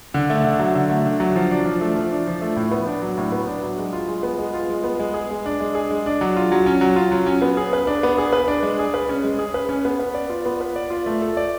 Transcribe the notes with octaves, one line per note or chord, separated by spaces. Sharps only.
D3
A3
D3
F#3
D3
A3
D3
F#3
F3
D4
F3
A3
F3
D4
F3
A3
A2
B3
D4
F#3
A2
B3
D4
F#3
G#3
F4
G#3
B3
G#3
F4
G#3
B3
G#3
G#4
G#3
D4
G#3
G#4
G#3
D4
F#3
F4
F#3
C#4
F#3
F4
F#3
C#4
B3
G#4
B4
D4
B3
G#4
B4
D4
G#3
G#4
B4
C#4
G#3
G#4
B4
C#4
B3
B4
D5
F4
B3
B4
D5
F4
A3
A4
D5